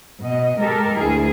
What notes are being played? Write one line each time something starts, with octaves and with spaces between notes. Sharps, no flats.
B2 D#5
G#3 G4 A4 A#4
D2 E4 G#4